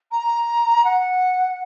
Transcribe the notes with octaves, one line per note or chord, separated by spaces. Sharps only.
A#5
F#5